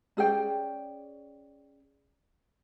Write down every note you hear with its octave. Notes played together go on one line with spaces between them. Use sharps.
C#4 G#4 D5 G5